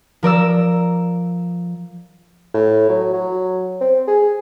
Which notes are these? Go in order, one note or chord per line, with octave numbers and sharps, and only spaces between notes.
F3 A#4 D5 E6
A2
F#3
F#3
C4
G#4